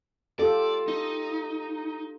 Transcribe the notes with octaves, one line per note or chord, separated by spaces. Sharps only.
F4 G4 A4 D5
D#4